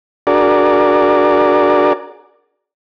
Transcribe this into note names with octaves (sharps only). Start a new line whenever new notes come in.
D4 F#4 G#4 A#4 D5